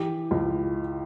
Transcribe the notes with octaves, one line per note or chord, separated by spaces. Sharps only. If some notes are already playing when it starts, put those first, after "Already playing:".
Already playing: E3 G4
C#2